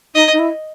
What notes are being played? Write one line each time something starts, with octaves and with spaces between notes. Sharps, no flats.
D#4 D#5
D#4
E4